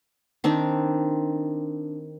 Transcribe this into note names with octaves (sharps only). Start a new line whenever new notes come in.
D#3 C4 D4